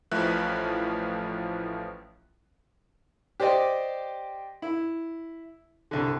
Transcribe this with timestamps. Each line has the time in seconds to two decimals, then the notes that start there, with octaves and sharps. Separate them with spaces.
0.11 A1 A2 F3 B4 E5 F#6
3.40 G4 C5 D5 D#5
4.62 E4
5.91 C2 D3